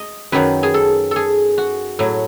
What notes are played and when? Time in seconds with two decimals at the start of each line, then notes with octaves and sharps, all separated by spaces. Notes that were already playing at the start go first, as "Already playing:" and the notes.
Already playing: D#5
0.32 F#2 D#3 F#3 B4
0.63 G#4
0.74 A4
1.11 G#4 A4
1.58 F#4
1.99 A2 F#3